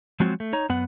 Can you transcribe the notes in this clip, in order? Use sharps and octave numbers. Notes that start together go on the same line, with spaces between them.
F3 F#3 G#3 C4 F4 F#4
A3
D#4 C#5 A#5
F#2 B3 F#5